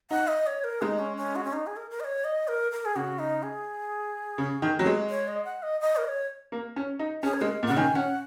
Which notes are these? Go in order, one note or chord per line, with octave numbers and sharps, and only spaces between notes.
D#4 F#5
D#5
C#5
A#4
G#3 D#4
C#4
C#4
F#4
C#4
D#4
G#4
A#4
A#4
D#5
C#5
D#5
A#4
A#4
G#4
C#3 F#4
D#4
G#4
C#3
D#3
F#3
G#3
C#5
D#5
F#5
D#5
D#5
A#4
D#5
C#5
A#3
C#4
D#4
C#4 G#4
C#5
G#3 A#4
A#2
C#3 F#5
D#3 G#5
C#4 F#5